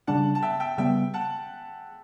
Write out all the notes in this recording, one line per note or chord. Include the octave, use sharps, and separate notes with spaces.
C#3 G3 D4 F#5 A5
A5
E5 G5
E5 G5
C#3 G3 B3 E5 G5
F#5 A5